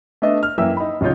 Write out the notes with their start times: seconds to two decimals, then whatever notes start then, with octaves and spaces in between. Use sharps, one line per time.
0.22 A3 B3 D4 D#5 E5
0.43 F6
0.58 F#2 E3 A#3 E5 G5 E6
0.77 D#4 B5
1.01 D1 C#3 D#4 F4 C#5 G6